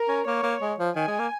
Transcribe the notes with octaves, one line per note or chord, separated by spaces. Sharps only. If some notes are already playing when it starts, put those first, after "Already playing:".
Already playing: A#4
C#4
A#3 C#5
A#3
G#3
F3
D#3 G#5
G#3
A#3